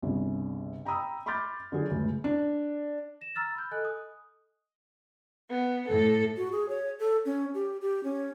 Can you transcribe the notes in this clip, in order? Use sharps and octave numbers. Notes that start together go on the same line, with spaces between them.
G1 C2 C#3
G5 A#5 B5 D#6 E6
B5 C6 D6 F6 G6 A6
D3 F#3 G#4
C#2 F#2 A2 C#3
D4
A#6 E7
A#5 E6 F6 A6
B5 F6 G6
A4 D#5 G#5 F#6
D#6
B3
A2 A4
F#4
G#4
C#5
A4
C#4
G4
G4
C#4